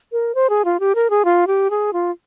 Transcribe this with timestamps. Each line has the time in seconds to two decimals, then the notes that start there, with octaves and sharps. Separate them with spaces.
0.12 A#4
0.35 C5
0.50 G#4
0.65 F4
0.80 G4
0.95 A#4
1.10 G#4
1.25 F4
1.47 G4
1.70 G#4
1.93 F4